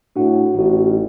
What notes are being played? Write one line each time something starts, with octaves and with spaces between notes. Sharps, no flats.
A2 D4 F#4 F#5
A1 D#4 E4 F#4